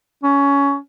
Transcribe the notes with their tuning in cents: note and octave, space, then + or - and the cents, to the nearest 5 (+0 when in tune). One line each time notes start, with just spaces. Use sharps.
C#4 +15